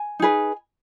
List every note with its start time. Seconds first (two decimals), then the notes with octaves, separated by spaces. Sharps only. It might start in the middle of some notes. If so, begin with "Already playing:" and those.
Already playing: G#5
0.19 D#4 G#4 B4